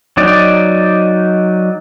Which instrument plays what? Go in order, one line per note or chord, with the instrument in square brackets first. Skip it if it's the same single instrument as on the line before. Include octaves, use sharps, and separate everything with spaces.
[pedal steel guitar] F#3 D#4 D5